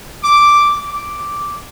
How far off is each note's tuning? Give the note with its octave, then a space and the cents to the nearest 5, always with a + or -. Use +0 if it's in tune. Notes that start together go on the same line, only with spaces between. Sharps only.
D6 +0
D6 -5